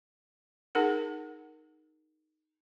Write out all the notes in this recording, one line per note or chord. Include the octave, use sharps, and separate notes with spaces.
D#4 G#4 A#4 F#5